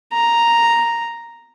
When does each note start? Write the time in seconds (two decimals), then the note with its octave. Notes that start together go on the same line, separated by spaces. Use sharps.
0.13 A#5